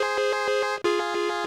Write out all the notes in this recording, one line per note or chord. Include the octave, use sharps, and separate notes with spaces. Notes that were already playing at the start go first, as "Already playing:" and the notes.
Already playing: G#4 C5
F4 G#4